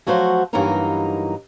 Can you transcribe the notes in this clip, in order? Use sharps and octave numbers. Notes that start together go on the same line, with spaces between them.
F3 F#3 A3 F#4 A4 C5
G2 E3 F#3 A#3 D#4 A#4